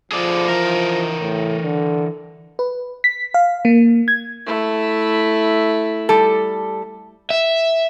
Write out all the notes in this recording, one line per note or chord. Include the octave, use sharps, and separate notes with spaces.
F3 G#4 A4 D5
E3 A#4
A2
D3
B4
B6
F5
A#3
G#6
A3 E4
G3 A4
E5